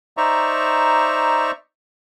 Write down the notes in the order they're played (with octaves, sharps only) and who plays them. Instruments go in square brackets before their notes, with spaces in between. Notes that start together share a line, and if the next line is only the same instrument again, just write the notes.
[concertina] D#4 C5 D5 E5 A#5 C#6